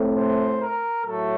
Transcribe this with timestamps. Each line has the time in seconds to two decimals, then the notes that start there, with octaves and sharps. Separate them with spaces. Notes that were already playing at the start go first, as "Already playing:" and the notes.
Already playing: A2 A3 C4
0.14 C5
0.59 A#4
1.03 A2 F#3 A3 A4